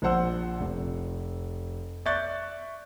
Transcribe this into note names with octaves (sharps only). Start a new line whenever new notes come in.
A#1 F3 C5 F#5 E6
F1
D5 E5 C#6 F#6 G6 A6